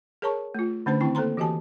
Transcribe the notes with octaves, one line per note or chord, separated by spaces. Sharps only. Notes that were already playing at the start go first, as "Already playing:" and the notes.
G#4 A#4 C#5 A5 A#5 C#6
A3 F4
D3 A3 C#4 D4 C5 B5
D#3 C4 E4 G5 B5
A#3 A4 C5 A#5 C6
E3 F#4 G4 D#5 G#5 A5